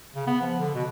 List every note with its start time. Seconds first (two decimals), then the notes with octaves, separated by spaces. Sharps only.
0.15 C#3
0.27 B3
0.42 F3
0.59 D3
0.75 B2